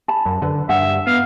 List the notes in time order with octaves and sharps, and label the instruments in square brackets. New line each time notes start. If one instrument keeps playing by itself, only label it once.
[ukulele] A5 B5
[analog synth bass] F#2
[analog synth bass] D3 [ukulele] B4
[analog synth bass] G2 [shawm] E5 [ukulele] F#5
[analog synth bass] B3 [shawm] F5